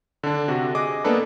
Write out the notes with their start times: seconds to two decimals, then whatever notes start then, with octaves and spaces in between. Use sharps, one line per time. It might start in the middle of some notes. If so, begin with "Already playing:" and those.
0.23 D3 D4
0.48 C3 F#4
0.75 G#4 D#5 D6
1.04 A#3 B3 D4 A4 B4